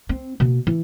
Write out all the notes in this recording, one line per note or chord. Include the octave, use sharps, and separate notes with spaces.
C4
B2 A#3
E3